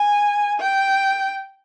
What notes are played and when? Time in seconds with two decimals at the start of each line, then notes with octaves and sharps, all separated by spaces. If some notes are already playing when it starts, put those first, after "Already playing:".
Already playing: G#5
0.60 G5